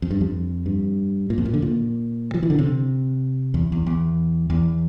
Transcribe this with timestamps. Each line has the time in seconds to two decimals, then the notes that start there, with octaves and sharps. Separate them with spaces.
0.02 F2
0.11 G2
0.21 F2
0.66 G2
1.30 A#2
1.38 F2
1.45 A#2
1.54 D3
1.62 A#2
2.34 F3
2.43 E3
2.50 D3
2.59 C3
3.54 E2
3.72 E2
3.86 E2
4.50 E2